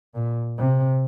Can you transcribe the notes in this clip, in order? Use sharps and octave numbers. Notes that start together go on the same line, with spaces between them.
A#2
C3